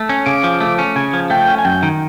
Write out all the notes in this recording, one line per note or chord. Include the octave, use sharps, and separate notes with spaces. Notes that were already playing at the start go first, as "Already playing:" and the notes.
Already playing: A3
C#4
C#3 D6
F3
A3
C#4
C#3 G#5
F3
A3 G5
C#4
G#5
F#2 G5
D#3